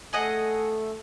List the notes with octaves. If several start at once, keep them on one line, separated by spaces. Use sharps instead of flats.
A3 G#4 A4 D#5 F#5